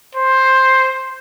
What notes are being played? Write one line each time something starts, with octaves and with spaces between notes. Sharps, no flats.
C5